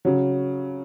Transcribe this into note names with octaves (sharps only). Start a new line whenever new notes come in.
C#3 F#3